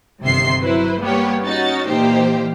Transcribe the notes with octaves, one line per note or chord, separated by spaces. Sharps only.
G1 C3 D#3 E5 C6 C7
F#3 E4 B4 C5
G3 A#3 B3 G4 C#5
C#4 D#4 F#4 A6
A#2 E3 A#3 D#4 G4 C5